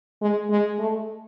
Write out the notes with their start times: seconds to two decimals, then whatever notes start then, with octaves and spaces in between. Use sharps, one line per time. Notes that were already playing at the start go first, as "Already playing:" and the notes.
0.22 G#3
0.50 G#3
0.79 A3